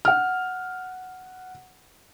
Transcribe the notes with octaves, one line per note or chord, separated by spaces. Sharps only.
F#5 F6